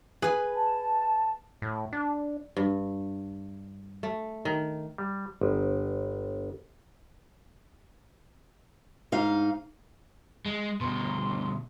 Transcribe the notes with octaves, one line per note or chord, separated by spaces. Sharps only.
G#4 B4 G#5
A5
A2
D4
G2
A3
D#3
G3
G1
G#2 D#4 F5
G#3
D2 B2 C6